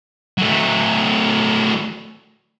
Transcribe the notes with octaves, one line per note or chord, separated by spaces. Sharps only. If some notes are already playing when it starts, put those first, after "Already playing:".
F#3 A3